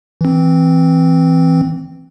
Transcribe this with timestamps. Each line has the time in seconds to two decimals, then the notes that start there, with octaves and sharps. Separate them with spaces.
0.21 E3 C4